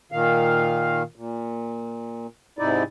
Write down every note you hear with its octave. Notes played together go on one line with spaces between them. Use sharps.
A#2 D#3 F5
A#2
G#2 C3 D#4 E4 D5